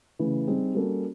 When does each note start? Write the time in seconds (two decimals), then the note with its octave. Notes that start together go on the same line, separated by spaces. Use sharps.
0.19 C#3 E3 A3
0.47 G3 C4 D#4 G#4
0.75 G3 A#3 C#4 F#4 A4